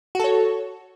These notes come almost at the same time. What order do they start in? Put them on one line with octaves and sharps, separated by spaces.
F#4 A4 C#5